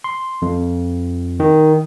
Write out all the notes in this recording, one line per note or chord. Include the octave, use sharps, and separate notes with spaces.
C6
F2
D#3